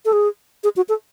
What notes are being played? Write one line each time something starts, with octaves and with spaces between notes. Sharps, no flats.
A4
G#4
G#4
F#4
A4